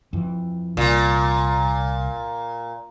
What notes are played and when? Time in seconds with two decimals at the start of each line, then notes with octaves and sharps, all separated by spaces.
0.13 F2 E3
0.77 C2 A#2